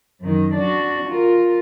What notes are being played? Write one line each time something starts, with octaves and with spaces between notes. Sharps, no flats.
F#2 D#3
D4 F#4
F4 A#4